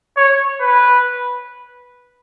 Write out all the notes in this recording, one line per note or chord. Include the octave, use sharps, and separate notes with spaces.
C#5
B4